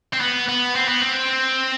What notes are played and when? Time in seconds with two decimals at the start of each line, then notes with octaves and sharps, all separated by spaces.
0.13 C4
0.21 B3
0.49 B3
0.76 C4
0.88 B3
1.01 C4